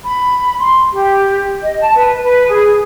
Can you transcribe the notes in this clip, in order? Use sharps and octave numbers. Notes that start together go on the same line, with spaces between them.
B5
C6
G4
D#5
A5
B4
B4
G#4